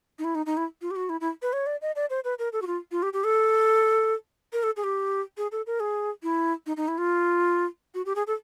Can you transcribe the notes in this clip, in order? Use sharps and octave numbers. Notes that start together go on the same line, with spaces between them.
D#4
E4
D#4
D#4
E4
F4
G4
F#4
E4
E4
B4
C#5
D5
D#5
D5
C5
B4
A#4
A4
F#4
F4
F4
G4
G4
A4
A#4
A4
G#4
G4
G#4
A4
A#4
G#4
E4
D#4
D#4
E4
F4
F#4
G4
G#4
A4